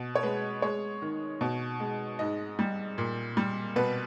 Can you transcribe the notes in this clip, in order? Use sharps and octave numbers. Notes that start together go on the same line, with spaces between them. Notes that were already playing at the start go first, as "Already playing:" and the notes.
Already playing: B2
C#5
G#3 B4
G#3 C#5
D#3
B2
G#3
G#2 D#5
G3
A#2
G3
B2 B4